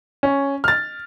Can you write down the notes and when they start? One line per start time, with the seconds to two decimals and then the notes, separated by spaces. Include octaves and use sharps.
0.23 C#4
0.64 F6 A6